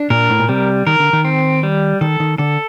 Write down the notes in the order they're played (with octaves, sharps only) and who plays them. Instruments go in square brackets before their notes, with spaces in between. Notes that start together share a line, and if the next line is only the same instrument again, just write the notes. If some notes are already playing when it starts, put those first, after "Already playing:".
Already playing: [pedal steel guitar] D4
[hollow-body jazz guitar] A#2 [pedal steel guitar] A#4
[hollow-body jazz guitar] A2
A#2
[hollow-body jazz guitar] C3 [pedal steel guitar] G3
[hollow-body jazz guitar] D#3 [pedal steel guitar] A#4
[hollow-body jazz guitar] D3
D#3
[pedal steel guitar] C4
G3
[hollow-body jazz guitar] D#3 [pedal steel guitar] A4
[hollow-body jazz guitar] D#3
[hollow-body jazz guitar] D3 [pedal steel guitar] A4